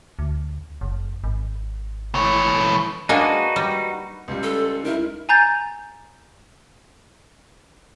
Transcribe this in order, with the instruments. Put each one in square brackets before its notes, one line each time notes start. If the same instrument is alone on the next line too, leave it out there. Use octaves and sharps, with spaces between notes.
[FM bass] D2
F#1
G#1
[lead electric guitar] E3 C#5
[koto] G#3 A#3 D4 [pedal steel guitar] D#4 F#4 B4
[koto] G3
[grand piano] C#2 G3
[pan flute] A4
[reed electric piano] D#4 E4 [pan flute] A#4
[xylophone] G#5 A#5 G6 A6